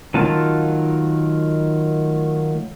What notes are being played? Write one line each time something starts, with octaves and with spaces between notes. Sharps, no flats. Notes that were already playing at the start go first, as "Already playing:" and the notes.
D#3 F#3 A3 F4 A5